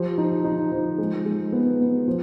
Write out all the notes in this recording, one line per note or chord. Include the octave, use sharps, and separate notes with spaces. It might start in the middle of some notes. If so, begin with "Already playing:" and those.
Already playing: F3 G4
D#4
D#4
F3
G#3
G#3
B3
B3
F3